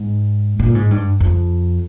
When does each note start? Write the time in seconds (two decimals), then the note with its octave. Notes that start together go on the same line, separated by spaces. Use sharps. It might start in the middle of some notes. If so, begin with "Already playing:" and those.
Already playing: G#2
0.59 A#2
0.75 G#2
0.91 G2
1.20 F2